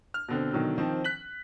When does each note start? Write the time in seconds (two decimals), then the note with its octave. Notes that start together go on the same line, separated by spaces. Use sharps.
0.14 F6
0.28 B2 D3 C4
0.54 B2 D3 D#3 F#3
0.78 D#3 F3 C4
1.04 F#6 B6 F#7